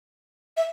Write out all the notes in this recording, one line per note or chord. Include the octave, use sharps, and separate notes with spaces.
E5